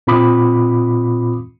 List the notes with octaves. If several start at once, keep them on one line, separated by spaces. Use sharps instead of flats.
A#2 C4 F4 B5 D6 D#6